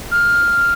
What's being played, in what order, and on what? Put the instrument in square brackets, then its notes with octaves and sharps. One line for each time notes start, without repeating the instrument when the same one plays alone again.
[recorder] F6